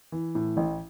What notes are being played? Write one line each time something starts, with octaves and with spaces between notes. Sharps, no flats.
E3
A2
A1